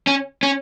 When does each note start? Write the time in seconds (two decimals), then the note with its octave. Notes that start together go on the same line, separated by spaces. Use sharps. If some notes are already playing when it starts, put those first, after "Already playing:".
0.07 C#4
0.43 C#4